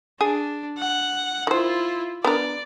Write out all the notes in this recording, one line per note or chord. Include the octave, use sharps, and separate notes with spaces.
D4 G#4
F#5
D#3 E4 F4 C5
B3 D4 A#4 D5